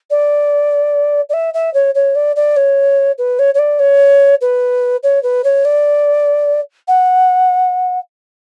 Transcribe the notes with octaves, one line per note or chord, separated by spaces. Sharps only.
D5
D5
E5
E5
C#5
C#5
D5
D5
C#5
B4
C#5
C#5
D5
C#5
B4
C#5
B4
C#5
D5
F#5